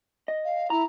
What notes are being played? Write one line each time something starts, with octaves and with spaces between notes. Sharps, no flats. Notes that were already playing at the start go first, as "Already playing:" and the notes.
D#5
F5
E4 A#5